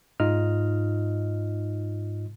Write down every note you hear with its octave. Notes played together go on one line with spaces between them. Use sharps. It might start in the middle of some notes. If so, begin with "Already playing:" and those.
G#2 D#4 F4 D#5 F6